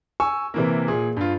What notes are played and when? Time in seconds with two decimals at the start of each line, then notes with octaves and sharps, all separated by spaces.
0.20 G#5 C#6 E6
0.54 C3 E3 A#3
0.88 A#2 G#4
1.17 G2 F4